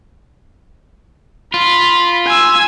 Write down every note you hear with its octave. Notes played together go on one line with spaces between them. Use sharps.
F4 B5
G#5 E6